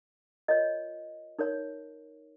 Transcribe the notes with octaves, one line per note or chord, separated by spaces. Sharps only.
F4 A#4 C#5 D#5
D#4 A#4 C#5